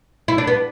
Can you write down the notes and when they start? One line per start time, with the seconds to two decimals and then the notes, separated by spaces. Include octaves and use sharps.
0.28 E4
0.38 D4
0.47 B3